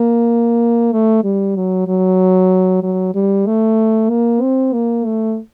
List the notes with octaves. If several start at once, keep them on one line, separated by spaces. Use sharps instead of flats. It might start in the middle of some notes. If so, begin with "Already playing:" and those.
Already playing: A#3
A3
G3
F#3
F#3
F#3
G3
A3
A#3
C4
A#3
A3